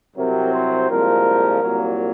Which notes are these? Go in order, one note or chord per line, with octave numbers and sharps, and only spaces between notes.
C2 C3 F#3 C4 A#4
C5
C2 A#2 F3 G#3 A#4
C2 A#2 F#3 A#3